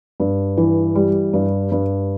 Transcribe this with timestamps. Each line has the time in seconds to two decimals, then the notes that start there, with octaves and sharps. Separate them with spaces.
0.20 G2
0.57 E3
0.95 G3
1.33 G2
1.72 G2